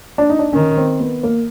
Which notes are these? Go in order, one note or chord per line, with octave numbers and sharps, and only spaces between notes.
D4
D#4
D4
D#3 C#4
C4
B3
A#3